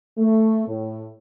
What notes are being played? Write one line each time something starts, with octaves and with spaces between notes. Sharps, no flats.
A3
A2